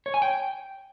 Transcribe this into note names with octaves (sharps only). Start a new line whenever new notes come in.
C#5
G#5
G5